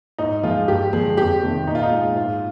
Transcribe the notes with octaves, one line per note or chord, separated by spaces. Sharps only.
G#2 D#4
F3 G#3 F4
G2 G4
D3 F3 G#3 G#4
F2 G4
C3 D#3 G3
A#2 D#4
F4
D#4
G#3
G#2 F4